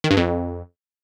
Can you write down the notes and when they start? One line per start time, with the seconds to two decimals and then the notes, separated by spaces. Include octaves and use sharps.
0.04 D#3
0.11 G2
0.17 F2